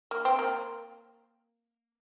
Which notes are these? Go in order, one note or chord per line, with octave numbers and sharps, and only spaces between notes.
A#3
C4
A#3